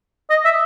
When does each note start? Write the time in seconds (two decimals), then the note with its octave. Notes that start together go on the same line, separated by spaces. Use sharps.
0.30 D#5
0.45 E5